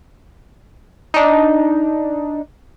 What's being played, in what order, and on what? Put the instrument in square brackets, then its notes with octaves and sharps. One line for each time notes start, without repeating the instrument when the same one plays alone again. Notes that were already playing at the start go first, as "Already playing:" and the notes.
[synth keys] D4 D#4